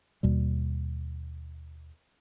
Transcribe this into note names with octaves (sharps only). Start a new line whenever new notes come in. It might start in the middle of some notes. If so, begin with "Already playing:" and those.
D#2 B2 G3